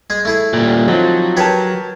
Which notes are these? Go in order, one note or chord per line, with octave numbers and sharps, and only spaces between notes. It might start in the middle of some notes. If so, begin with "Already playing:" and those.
G#3 G#4
A3 E4 G#4
A#2 G3
F3 F#3 C4 D#4
G4 G#4 A#4 B4 C#5 A5